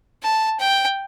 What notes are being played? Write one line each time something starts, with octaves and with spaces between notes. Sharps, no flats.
A5
G5